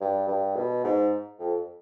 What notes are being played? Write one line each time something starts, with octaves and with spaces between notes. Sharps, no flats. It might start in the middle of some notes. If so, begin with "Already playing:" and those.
G2
G2
B2
G#2
F2